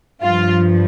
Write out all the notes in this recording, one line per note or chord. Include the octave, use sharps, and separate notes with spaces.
G2 F3 F4